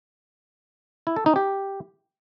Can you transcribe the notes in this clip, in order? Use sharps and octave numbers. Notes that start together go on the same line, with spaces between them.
E4
A4
D#4
G4